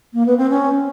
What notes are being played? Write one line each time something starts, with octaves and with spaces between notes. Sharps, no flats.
A#3
B3
C4
C#4